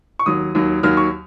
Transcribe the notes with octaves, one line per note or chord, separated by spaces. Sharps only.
C#6
D#2 D#3 F#3 D#6
D#2 D#3 F#3
D#2 D#3 F#3 F6
C#6